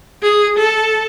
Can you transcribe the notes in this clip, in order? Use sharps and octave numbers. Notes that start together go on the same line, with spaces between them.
G#4
A4